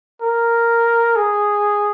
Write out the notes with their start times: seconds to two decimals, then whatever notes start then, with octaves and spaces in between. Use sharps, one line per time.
0.22 A#4
1.16 G#4